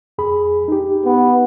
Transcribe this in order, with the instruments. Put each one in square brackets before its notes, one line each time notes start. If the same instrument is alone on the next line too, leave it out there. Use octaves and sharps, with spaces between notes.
[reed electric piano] F2 G#4 B5
D#4 G4
[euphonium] B3